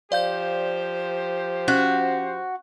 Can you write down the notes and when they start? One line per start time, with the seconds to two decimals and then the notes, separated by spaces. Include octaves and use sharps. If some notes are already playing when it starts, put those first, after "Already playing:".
0.12 F3 G4 C5 D5 F5 G6
1.68 C#4 F#4